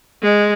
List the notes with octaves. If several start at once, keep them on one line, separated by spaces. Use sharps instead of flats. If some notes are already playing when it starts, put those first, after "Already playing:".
G#3